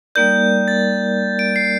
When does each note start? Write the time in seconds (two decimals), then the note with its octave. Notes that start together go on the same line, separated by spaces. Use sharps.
0.15 G3 A#3 D#4 A#4 D5 G6
0.68 A6
1.39 D7
1.56 C7